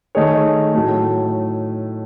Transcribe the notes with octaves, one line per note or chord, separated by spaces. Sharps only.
D#3 A3 D#4 G#4 C#5
A2 F#3 A3